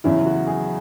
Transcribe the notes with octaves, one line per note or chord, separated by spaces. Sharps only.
E2 C#3 F#3 E4
F#4
G#4